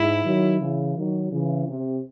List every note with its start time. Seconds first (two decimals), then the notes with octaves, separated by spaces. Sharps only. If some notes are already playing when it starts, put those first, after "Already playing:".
Already playing: G#2 E4
0.25 D#3 F#3
0.60 C#3 E3
0.96 D#3 F#3
1.31 C#3 E3
1.67 C3